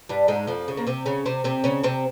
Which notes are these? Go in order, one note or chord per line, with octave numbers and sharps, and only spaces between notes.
G2 G3
G#2 G#3
F2 F3
C#3
A#3
C3 C4
C#3 C#4
C3 C4
C3 C4
C#3 C#4
C3 C4